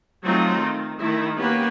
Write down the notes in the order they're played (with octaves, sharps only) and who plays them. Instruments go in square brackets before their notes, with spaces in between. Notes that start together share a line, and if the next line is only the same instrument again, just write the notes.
[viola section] F#3 A3 C4 D#4 F4
D#3
D#3 A3 E4
A#3 B3 C#4 G4 B4